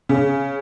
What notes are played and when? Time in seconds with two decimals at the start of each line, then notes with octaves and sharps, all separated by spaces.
0.09 C#3